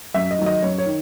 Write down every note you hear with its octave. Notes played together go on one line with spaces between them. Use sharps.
F#2 E5
D#5
D#3 F#3
D#5
F#2 C#5
C#5
D#3